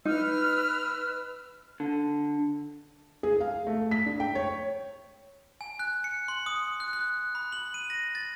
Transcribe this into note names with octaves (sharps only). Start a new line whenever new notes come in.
D#4 B4 E6 F6
D3
G#4
F5
A3
B6
D4
G5
C#5
G#5
F#6
C#7
C6
D#6
F#6
F#6
B5
F#7
D#7
A#6
A6